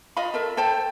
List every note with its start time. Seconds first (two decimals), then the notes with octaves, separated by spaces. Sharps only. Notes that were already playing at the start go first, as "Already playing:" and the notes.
0.17 F4 D#5 F5 B5
0.34 A4 A#4 E5
0.57 A4 C5 G5 A5